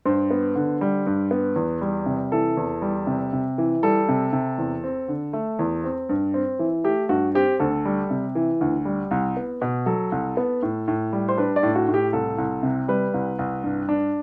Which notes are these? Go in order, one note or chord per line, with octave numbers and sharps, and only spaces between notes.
G2 C5
B3
D3
G3
G2
B3
E2
G3
C3
E3 A4
E2
G3
C3
C3
E3
G3 A4
C3
C3
E2
C4
D3
A3
E2
C4
G2
C4
E3
A3 G4
G2 F#4
C4 G4
D2 A4
G3
C3
E3
D2
G3
C2
B3
B2
F#3 A4
C2
B3
A2
A2
G3
C5
D4 B4
D5
A2
F#4
A2
G4
C2 A4
C2
C3
G3 B4
C2
C2
G2
D4